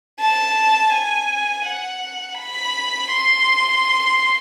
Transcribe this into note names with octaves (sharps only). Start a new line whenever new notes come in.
A5
G#5
F#5
B5
C6